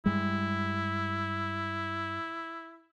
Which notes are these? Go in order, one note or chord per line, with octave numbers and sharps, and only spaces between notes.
G2 G3 G#3 E4